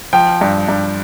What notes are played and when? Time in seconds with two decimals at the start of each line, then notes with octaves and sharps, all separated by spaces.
0.13 F3 G5
0.41 G2
0.69 G2